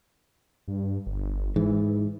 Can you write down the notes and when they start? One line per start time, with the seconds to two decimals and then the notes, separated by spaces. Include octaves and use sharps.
0.68 G2
1.07 G1
1.56 G#2 E3